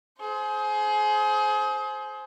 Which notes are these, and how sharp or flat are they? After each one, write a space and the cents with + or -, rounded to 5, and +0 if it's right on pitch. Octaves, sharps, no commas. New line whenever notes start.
G#4 +30 C5 +0